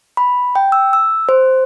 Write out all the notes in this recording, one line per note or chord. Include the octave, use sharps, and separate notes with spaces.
B5
G5
E6
E6
C5